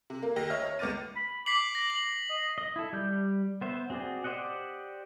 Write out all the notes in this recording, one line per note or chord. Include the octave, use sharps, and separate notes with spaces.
C3
A#3
D#2 A#6 C7
C#5 D#5 E5 F6
C#5
C#2 B3 D6 F6 A6 D#7
B5
D6 B6 C7 F#7
A#6
F#7
D#5
D#5
E4 A4
G3 G6
B3 C5 E5
C4 F#4 G#4 D5
G4 C5 D5 D#5 F#5